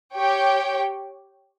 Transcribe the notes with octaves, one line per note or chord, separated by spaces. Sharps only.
G4 C#5 G5